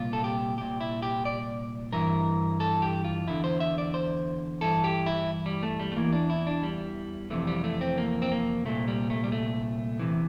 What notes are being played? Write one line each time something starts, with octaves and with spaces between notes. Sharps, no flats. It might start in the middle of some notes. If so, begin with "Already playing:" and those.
Already playing: C2 A#2 F4
A4
G4
C2 A#2 G4
E4
G4
D5
G2 E3 A#4
A4
G4
F4
E2 D3 E4
C5
E5
D5
C5
G2 E3 A4
G4
E4
G3
A3
G3
A3
E2 E3 A#3
D4
E4
D4
G3
F2 C3 E3 A3
G3
A3
C4
A#3
C4
A#3
C2 A#2 A3
G3
A3
G3
A3
E2 C3 E3